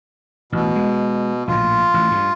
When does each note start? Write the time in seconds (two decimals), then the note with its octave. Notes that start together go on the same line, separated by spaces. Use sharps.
0.52 A1 B2
0.76 G#3
1.48 A#1 A2 F4
1.94 A1
2.11 G2